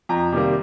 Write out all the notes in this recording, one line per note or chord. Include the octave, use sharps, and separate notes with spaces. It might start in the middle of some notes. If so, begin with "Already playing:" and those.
F2 A#5
C3 D#3 G3 A#3